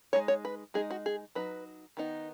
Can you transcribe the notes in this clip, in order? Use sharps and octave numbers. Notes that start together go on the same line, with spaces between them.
G#3 D#4 C#5
C#5
B4
G#3 D#4 G#4
F#4
G#4
F#3 D#4 B4
D#3 B3 D#4